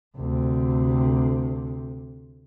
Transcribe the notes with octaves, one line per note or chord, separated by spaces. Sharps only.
D2 C3